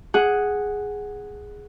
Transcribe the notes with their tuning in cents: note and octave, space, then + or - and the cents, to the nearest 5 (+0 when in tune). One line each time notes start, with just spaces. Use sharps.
G#4 +0 F#5 +0